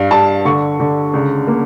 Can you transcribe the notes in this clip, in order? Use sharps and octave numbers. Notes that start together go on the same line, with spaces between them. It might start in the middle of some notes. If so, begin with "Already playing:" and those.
Already playing: G2 F5
G2 A5
D3 C#6
D3
C#2
A#3